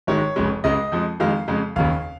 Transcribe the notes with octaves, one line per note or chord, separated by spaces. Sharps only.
G#1 G#2 D#3 G#3 C#5
F1 F2 C#3 G#3
C#2 C#3 G#3 D#5
F2 F3 G#3
F2 D#3 G#3 F5
F2 C#3 G#3
F1 D#2 C#3 F5